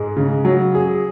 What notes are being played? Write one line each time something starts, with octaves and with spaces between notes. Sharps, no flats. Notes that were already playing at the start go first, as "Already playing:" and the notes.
Already playing: G#2 G#3
C#3
F#3
G#4